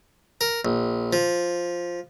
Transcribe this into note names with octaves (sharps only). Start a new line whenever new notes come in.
A#4
A#1
F3